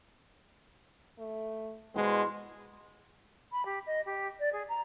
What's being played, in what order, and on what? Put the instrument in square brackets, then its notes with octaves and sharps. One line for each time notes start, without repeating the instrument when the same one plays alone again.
[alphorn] A3
[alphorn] B2 [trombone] G#3 [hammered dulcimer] C6
[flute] B5
G4
D#5
G4
D5
G#4
A#5